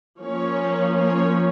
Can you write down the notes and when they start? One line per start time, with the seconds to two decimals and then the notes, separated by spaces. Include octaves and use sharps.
0.21 F3 A#3 C#4 C#5
0.97 C#5